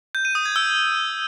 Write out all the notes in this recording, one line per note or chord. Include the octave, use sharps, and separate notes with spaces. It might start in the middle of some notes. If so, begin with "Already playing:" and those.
G6
D#7
D#6
G#6
E6